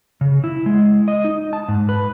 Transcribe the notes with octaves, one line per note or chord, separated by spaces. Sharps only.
C#3
E4
G#3
D#5
D#4
A5
G#2
B4